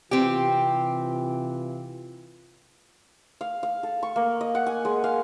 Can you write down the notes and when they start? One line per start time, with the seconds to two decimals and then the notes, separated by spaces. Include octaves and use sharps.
0.11 C3 E3 C4 F4 G4
3.41 F5
3.63 F5
3.83 A4
4.03 C#6
4.16 A#3
4.41 D#5
4.55 F#5
4.66 G#5
4.85 G#3
5.04 F5